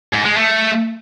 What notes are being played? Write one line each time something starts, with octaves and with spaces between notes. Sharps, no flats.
G#2
G#3
A3